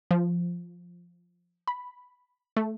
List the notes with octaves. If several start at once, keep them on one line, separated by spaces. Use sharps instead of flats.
F3
B5
A3